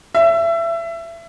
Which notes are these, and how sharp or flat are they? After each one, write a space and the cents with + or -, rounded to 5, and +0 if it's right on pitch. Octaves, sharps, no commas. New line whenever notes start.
E5 +25